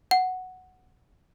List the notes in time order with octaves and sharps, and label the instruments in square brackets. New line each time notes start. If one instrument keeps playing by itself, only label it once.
[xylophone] F#5